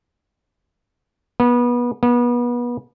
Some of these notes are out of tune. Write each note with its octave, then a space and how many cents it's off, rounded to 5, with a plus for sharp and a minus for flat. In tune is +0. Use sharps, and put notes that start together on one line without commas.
B3 -25
B3 -30